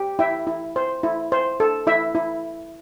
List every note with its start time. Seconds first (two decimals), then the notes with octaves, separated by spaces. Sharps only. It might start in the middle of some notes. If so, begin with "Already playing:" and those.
Already playing: G4
0.19 E4 E5 G5
0.47 E4
0.76 C5
1.03 E4
1.32 C5
1.60 A4
1.87 E4 E5
2.15 E4